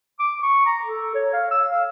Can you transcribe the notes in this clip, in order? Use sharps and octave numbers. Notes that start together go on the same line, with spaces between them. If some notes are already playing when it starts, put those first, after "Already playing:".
D6
C#6
A#5
A4
C#5
F5
E6
F5